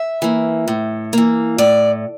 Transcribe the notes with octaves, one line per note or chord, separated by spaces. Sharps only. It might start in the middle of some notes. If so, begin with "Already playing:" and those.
Already playing: E5
E3 A#3
A2
E3 A#3
A2 D5